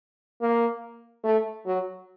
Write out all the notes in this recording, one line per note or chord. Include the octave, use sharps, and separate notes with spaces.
A#3
A3
F#3